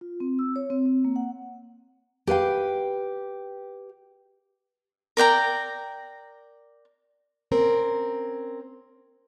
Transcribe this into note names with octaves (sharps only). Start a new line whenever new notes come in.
F4
C4
E6
C#5
C4
C4
A#3
F#5
G4 B4 F5 G5
A#4 D5 G5 A#5
C4 C#4 A#4